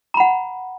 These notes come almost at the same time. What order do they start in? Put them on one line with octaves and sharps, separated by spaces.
A#5 B5 F#5